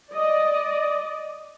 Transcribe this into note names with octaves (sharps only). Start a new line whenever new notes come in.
D5 D#5